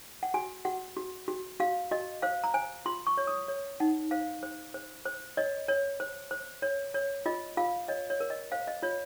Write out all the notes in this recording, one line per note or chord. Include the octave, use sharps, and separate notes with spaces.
F#5
F#4 G#5
F#4 F#5
F#4
F#4
F#4 F5
F#4 D#5
C5 F5
A#5
C5 G#5
F4 C6
C#6
C#5
D#6
C#5
D#4 F#5
C5 F5
C5
C5
C5
C#5 D#5
C#5
C5
C5
C#5
C#5
F4 D#5
F4 F5
C#5 D#5
C#5
A#4
D#5
C5 F5
D#5
F4 C#5